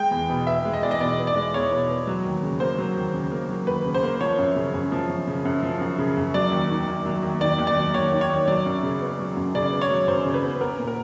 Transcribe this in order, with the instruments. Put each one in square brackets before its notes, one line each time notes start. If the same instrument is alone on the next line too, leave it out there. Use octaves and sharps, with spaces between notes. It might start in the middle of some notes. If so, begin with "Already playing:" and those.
Already playing: [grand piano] G#3 G5
E2
B2
B3 E5
G#3
D#5
E2 D5
D#5
B2 D5
B3
D5
G#3
E2 C#5
B2
B3
F#3
D#2
C#3
A#3 C5
F#3
D#2
C#3
A#3
F#3
D#2 B4
C#3
C5
A#3
F3 C#5
F#2
C#3
F#2
F3
F#2
C#3
F#2
F3
F#2
C#3
F#2
F#3 D5
D#2
D#3
D#2
F#3
D#2
D#3 D5
D#2
D5
F#3
D#2 C#5
D#3
C#5
D#2
F#3 D5
F#2
C#3
B3
F#3
F#2
C#3 D5
B3
C#5
F#3
F#2 C5
C#3
B4
B3
B3 A#4
A#2
A#4